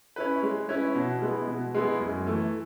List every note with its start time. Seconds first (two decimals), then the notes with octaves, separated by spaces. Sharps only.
0.16 C#4 E4 B4
0.43 G#3
0.69 C#4 E4 B4
0.95 B2
1.22 G#3 B3 E4
1.48 B2
1.74 G#3 B3 E4
2.00 F#2
2.26 E3 A3